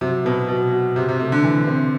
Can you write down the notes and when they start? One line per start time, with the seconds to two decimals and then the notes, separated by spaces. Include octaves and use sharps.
0.01 C3 F#3
0.25 B2 B3
0.48 B2 F#3
0.72 F#4
0.96 C3 G4
1.09 C3
1.19 C3 A3
1.32 D3
1.44 E3
1.67 C4